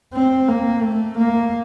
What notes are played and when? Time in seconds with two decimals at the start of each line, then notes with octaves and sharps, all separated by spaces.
0.13 C4
0.49 A#3
0.82 A3
1.17 A#3